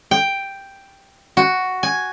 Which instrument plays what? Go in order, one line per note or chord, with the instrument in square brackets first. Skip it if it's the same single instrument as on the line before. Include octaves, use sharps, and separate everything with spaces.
[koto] G5
F#4
G#5